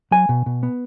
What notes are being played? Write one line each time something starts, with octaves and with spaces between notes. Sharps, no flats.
F#3 G#5
B2
B2
B3